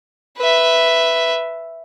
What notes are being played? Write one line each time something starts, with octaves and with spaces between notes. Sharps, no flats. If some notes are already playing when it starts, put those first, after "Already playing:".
B4 E5